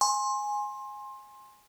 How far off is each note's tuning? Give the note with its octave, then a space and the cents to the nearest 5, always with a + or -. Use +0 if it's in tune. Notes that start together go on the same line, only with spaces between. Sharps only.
G#5 +0 C6 +25